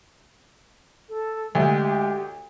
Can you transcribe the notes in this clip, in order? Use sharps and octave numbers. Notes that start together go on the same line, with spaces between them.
A4
D2 G#3 G4